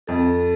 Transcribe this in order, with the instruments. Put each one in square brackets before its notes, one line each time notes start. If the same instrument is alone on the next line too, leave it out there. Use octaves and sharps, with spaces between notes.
[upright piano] F2 [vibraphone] A4